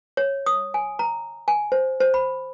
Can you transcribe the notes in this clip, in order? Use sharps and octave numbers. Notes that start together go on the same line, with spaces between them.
C#5
D#6
G#5
A#5
G#5
C5
C5
B5